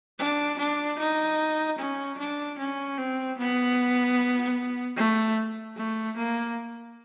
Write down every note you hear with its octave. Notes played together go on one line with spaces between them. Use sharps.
D4
D4
D#4
C#4
D4
C#4
C4
B3
A3
A3
A#3